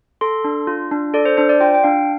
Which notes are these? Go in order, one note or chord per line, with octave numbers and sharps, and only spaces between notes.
A4 C6
D4
F4
D4
A4 D5
C5
D4 C5
D5
F4 G5
G5
D4 F5